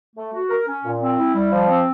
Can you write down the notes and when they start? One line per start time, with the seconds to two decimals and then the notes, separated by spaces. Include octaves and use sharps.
0.16 A3
0.33 F#4
0.50 A#4
0.67 C#4
0.84 A#2
1.01 C4
1.18 E4
1.35 G3
1.52 F3
1.69 C4